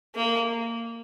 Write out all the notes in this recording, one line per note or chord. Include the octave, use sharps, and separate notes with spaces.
A#3